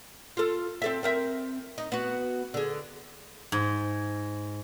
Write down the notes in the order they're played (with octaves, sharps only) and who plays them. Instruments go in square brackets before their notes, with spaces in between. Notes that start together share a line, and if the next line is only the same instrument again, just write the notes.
[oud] F4 A4
C4 A4 E5
C4 A#4 E5
D#4
B3 F#4
D3 G#4
[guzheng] G#2